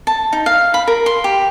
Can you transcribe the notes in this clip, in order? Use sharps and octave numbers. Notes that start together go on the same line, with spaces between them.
A5
D#4
F5
B5
A#4
C6
G4